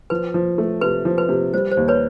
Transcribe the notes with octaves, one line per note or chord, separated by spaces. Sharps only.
F3 B4
F3
A3
C3 B4
F3
B4
C3
G3 C5
C5
D#2
B4 C#5